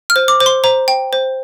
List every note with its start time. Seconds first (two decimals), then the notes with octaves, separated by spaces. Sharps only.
0.10 F6
0.16 C5
0.28 D6
0.40 C5
0.46 C6
0.64 C5 A#5
0.88 G5
1.13 C5